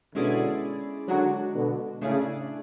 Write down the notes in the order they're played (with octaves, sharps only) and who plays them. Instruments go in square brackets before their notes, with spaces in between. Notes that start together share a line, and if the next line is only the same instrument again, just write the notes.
[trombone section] B2 D3 [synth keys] G#3 C#4 E4 G#4 D5
[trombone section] D3 F#3 [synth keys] G#3 D4 F#4
[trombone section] B2 D3
[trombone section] A2 C#3 [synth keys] A3 D4 G#4 D5